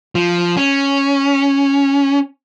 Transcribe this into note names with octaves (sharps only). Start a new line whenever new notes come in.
F3
C#4